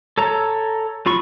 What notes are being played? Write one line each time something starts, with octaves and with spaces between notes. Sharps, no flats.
A4 C#5 A#5
F#3 F4 B5 C#6